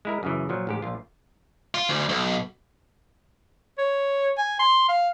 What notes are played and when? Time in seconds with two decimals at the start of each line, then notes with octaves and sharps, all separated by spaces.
0.05 G#3 E4 A#4
0.23 F#2 C#3 E3
0.49 A#2 F3 F#3
0.67 A1 G#2 G4
0.82 A#1 F4
1.74 F4
1.89 D2
2.09 B1
3.78 C#5
4.38 G#5
4.59 C6
4.89 F5